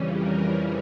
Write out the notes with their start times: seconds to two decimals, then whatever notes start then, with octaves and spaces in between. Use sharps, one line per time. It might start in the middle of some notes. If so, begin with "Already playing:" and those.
Already playing: F2 C#3 E3 G3 C#4
0.19 A#4